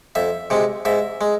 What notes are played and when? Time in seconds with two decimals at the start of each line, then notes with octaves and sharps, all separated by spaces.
0.15 F2 E5
0.50 C3 G#3
0.85 G#2 E5
1.21 G#3